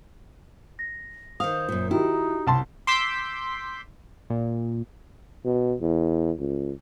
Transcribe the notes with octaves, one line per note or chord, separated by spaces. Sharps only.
A#6
D#3 C5 F5 D#6
F#2 A#2
D#3 D#4 E4 F#4 G4
C2 A5 C6
C6 D6 E6 G6 B6
A#2
B2
E2
C#2